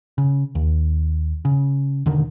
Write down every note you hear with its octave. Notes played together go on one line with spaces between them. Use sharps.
C#3
D#2
C#3
E1 D3 D#3